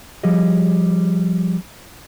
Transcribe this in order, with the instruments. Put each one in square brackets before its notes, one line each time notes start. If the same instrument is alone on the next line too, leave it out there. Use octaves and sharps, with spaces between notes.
[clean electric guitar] F3 G3 G#4 D#5